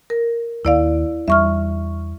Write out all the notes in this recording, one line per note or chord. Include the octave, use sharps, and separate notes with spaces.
A#4
D#2 E4 D5 F5
E2 G3 D4 E5 C#6 F6